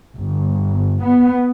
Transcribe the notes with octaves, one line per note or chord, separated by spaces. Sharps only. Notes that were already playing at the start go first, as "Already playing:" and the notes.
G1
B3